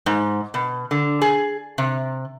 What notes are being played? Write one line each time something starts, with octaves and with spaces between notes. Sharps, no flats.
G#2
B2
D3
G#4
C3